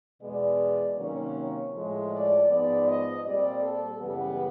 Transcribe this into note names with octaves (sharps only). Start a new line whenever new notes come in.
E2 B2 G#3 B3 D5
C3 D#3 F#3 A#3 C#4 C#5
A2 F3 G#3
D5
G#2 F3 G#3 B3 D5
D#5
A#2 G3 C4 D5
A4
F#2 C#3 E3 G3 B3 B4